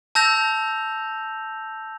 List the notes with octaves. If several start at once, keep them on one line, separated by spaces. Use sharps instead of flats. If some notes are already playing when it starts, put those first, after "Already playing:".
A5 E6 G6 A#6 F7